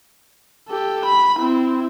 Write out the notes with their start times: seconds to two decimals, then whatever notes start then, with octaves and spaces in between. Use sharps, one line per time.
0.68 G4 A4
1.05 B5
1.36 C4 E4